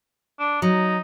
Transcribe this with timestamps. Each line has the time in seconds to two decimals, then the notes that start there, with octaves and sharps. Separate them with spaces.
0.39 D4
0.62 F#3 D#4